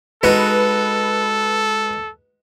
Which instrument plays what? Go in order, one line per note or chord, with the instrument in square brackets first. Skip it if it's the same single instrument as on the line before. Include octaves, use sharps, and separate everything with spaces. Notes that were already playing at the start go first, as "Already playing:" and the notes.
[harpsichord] G#3 D#4 F#4 [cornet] A4 [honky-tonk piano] B4